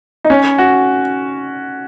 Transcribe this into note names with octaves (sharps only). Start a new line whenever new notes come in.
D#4
C#4
F#4